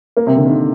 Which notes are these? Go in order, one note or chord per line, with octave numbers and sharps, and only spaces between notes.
A#3
C3
D3
D#3